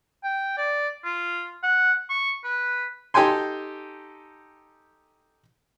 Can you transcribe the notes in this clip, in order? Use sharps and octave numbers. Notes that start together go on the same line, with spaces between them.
G5
D5
F4
F#5
C#6
B4
D#4 G4 A4 G5 G#5 C6